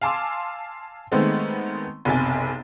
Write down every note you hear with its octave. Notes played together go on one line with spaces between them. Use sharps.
F5 G#5 A5 C6 D6 E6
D#3 G#3 A3 B3 C4
F#1 B1 C3 G#5 A6